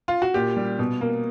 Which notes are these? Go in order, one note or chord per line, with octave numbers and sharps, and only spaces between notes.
F4
F#4
A#2 G4
G3
B2
A#3